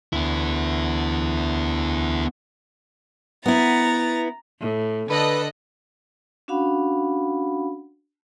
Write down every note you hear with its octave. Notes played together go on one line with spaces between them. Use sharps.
D2 B3 E4
B3 E4 A#5 A6
A2
D3 A4 B4 D#5 F#6
C#4 D4 F#4 F5 F#5 B5